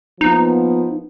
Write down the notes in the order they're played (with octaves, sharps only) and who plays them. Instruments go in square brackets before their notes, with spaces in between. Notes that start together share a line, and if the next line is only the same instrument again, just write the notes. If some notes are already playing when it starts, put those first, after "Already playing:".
[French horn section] F3 A#3 B3 [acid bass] D#4